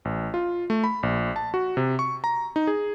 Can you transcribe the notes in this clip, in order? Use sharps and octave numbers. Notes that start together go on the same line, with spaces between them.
A1
F4
A3
B5
A#1
A5
F#4
C3
C#6
A#5
D#4
G#4